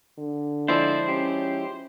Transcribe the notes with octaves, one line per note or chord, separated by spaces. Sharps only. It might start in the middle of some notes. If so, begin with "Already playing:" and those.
D3
F3 G#3 E4 C5 D5
C#4 G4